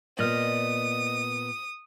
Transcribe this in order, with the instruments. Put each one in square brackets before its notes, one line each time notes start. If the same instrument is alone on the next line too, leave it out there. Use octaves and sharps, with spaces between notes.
[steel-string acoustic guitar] A#2 B3 [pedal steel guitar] D5 D#5 F6 [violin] D#6